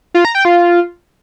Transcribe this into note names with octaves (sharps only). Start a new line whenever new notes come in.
F4
A#5
G5
F4